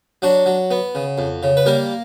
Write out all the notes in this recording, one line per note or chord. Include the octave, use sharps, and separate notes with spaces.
F#3 D4 F#4
F#3
B3
C#3
F2
C#3
B4
G3 A#3 A#4